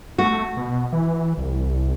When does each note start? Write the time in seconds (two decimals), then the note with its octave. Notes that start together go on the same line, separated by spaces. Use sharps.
0.18 A3 F#4
0.57 B2
0.92 E3
1.37 C2